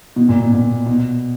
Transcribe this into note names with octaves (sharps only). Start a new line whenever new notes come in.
B2
A#2
B2
A#2
B2